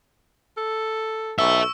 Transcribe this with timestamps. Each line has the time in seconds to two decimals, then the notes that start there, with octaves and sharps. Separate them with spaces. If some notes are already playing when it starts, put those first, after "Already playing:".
0.57 A4
1.39 B1 A4 E5 C#6 E6